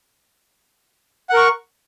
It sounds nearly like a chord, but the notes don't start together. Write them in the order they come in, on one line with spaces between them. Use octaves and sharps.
F#5 A#4 C#6